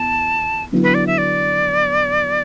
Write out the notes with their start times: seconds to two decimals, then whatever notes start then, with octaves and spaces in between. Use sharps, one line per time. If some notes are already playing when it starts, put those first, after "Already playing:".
Already playing: E2 A5
0.72 D3 F#3 B3 E4
0.83 B4
0.94 D5
1.07 E5
1.18 D5